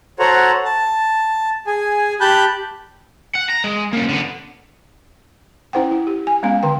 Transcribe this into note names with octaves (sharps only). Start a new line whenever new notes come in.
F#4 A4 C5 C#5 F#5 A#5
A5
G#4 G#5
G4 A5 B5 F#6 G6
F#5
A#5
G#3
A#3 C#4
D3 B3
C#4 E4 C5 F#5 G5
E4
G4
G#5
G#3 B3 C#4 F5
D3 D#3 G5